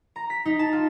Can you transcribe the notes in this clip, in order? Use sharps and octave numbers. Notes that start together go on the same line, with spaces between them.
A#5
B6
D#4
A5
F4